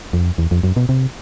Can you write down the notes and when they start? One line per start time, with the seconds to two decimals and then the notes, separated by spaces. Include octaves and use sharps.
0.13 F2
0.38 E2
0.51 F2
0.63 F#2
0.76 B2
0.89 C3